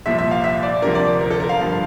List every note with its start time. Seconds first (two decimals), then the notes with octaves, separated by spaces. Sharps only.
0.06 C2 A#2 F3 E5
0.18 E5
0.31 F5
0.44 E5
0.63 D5
0.82 D2 C3 F3 A#4
0.95 D5
1.21 A#4
1.31 A4
1.40 A#4
1.49 F5
1.59 G2 D3 F3